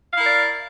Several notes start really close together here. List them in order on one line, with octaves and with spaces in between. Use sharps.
F5 E4 A#4 D5